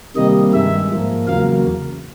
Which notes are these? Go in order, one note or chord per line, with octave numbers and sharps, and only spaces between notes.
C3 D#3 G3 A#3 D#5
G2 D#3 G#3 E5
G#2 F3 A#3
E2 C#3 F#3 A#3 F5